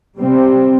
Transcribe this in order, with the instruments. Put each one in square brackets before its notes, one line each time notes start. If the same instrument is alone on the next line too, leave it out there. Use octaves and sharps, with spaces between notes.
[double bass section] C3 G3 C4